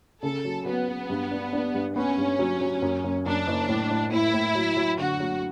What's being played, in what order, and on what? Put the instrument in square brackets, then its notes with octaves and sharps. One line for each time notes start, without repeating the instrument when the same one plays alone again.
[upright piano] C#3 [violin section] A4
[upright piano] F#3
[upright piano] F#3 [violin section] B3
[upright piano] F#3
G2
D4
D4
G2
[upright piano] B3 [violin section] C#4
[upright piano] G2
F#3
F#3
F#2
F#2
[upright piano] F#2 [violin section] D4
[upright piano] F#1
A2
A2
[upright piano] A2 [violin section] E4
[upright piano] A2
F#3
F#3
[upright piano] D3 [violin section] F#4
[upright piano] F#3